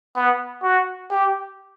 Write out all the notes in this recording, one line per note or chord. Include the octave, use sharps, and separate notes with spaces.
B3
F#4
G4